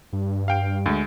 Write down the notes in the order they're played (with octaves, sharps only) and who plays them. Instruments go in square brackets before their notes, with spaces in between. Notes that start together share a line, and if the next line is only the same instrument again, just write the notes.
[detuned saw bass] G2
[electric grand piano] F5 G5 D7
D2 G#3